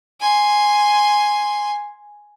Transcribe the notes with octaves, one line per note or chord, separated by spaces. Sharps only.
G#5 C6